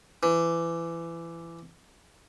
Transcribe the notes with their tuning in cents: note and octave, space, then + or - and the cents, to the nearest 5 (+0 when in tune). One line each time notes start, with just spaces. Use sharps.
E3 +25